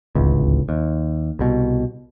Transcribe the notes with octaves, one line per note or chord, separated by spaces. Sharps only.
D1 G#1 C#2
D#2
C2 B2